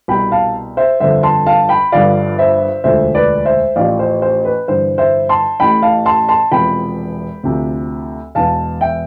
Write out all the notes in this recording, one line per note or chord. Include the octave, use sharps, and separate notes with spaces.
C2 B2 G5 B5
F5 A5
C5 E5
G1 F2 D3 F3 C5 E5
A5 C6
F5 A5
G5 B5
G1 G2 D3 F3 D5 F5
C5 E5
E1 D2 D3 F3 C5 E5
B4 D5
C5 E5
A1 A2 F3 D5 F5
C5
C5
B4
G1 G2 E3 C5
C5 E5
A5 C6
A1 A2 E3 G5 B5
F5 A5
A5 C6
A5 C6
E1 E2 C3 F3 G5 B5
D2 C3 F3
E1 E2 B2 F5 A5
E5 G5